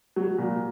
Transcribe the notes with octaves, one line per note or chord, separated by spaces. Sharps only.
F#3
A#2